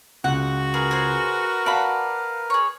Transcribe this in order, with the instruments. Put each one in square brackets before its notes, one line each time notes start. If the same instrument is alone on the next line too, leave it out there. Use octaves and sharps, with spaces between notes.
[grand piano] C#2 [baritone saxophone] F#4 [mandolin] F#5
[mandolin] G#4 [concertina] A#4 B4
[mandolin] G#4 C5
[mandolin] D5 B5 [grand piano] F5 F#5 A5
[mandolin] G#4 C#5